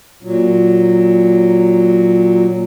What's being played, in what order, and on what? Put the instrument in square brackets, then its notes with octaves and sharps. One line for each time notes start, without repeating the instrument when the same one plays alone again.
[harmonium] A#2 F#3